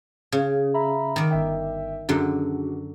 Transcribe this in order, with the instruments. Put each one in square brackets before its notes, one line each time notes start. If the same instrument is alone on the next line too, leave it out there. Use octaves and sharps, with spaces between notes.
[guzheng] C#3
[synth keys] E5 A#5 B5
[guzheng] D#3 D5
[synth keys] G1 E5 G5
[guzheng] F#2 D3 [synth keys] D4 F#4 G#4